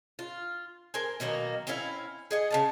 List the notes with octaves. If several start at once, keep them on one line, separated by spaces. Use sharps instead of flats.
F4
A#4 C5 G#5
B2 D#3 F#3 A#3
C4 C#4 E4 F5
G#4 D#5 F#5
C#3 C#4 A5